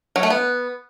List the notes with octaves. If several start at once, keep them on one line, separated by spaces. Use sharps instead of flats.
F#3
A3
B3